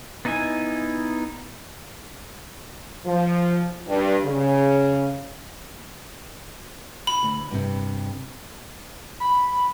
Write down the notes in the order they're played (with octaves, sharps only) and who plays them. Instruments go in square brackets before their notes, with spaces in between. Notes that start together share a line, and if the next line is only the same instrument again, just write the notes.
[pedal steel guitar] B3 D#4 E4 D#5 G#5
[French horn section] F3
G2
C#3
[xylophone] B5
[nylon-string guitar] D2
G2 C3
[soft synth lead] B5